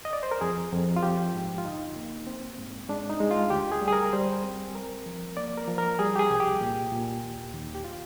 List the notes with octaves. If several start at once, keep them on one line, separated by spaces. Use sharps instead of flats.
D#5
D5
C5
A#4
F2 G#4
F2
F4
F3 G4
G#2
F4
D3 D#4
A#3
C4
G#2
G#3 D4
D#4
G#3
F4
D2 G4
G#4
G3
G#4
A#4
G3 C5
C4
C2 A#4
F3
A#3 D5
A#4
F3
A#4
G3 G#4
G4
G#4
C2
G4
A#2
A#2
D#2
D#2
G4
F4